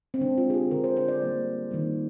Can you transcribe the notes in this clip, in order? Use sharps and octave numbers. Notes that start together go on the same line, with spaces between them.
C4
D3 G#3 D4
F4
G#4
G4
D3 G#3 A#4
C5
C5
D5
D3 G3 A#3
D#3 G3 A#3